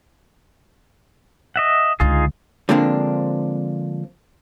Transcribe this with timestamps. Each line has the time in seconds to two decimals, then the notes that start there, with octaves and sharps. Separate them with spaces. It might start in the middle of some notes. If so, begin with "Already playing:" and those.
1.56 D#5 E5 F#5
2.00 C#2 D3 D#4 F4 G#4
2.69 D3 F3 G#3 A#3 C4 D4